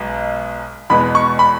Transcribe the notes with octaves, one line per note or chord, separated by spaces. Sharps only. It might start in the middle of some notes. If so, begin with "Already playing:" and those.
Already playing: B1 B2 G#3 B3
E2 B2 G#3 B3 B5
C#6
B5